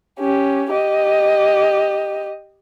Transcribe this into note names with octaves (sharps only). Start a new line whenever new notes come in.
C#4 G4
G4 D#5